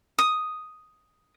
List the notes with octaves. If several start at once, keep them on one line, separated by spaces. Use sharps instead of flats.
D#6